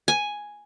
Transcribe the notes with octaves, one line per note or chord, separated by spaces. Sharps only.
G#5